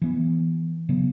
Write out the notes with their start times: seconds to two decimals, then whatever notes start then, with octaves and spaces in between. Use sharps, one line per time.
0.02 E3 B3
0.89 C#3 F#3 B3